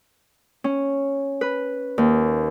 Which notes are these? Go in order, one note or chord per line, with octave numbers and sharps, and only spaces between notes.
C#4
B4
D#2